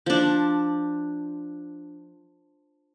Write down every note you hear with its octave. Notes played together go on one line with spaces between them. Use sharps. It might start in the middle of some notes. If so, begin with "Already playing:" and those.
F3 D4